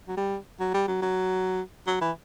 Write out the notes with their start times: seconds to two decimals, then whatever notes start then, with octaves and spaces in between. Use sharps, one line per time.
0.08 F#3
0.17 G3
0.60 F#3
0.74 G3
0.88 F#3
1.02 F#3
1.87 F#3
2.01 E3